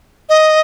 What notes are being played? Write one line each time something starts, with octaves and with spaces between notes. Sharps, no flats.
D#5